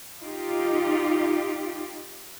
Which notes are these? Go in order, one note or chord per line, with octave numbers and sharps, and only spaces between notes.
D#4 F4 G4